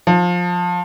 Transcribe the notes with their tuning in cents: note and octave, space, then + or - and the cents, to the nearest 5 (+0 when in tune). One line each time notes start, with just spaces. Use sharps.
F3 +20